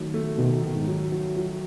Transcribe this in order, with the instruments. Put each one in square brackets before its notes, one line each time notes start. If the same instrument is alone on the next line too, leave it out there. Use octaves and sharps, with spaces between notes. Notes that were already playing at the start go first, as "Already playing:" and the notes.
Already playing: [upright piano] D#3 F#3 A3
A3
[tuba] B2 [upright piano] D#3
[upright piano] D#3
[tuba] G#2
[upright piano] F#3
F#3
F#3